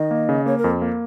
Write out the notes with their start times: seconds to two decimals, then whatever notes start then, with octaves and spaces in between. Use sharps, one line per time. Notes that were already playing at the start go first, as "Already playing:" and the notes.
Already playing: D#3 D#5
0.11 A#3
0.29 C#3
0.46 A#3 C#5
0.58 A#4
0.64 F2
0.82 A#3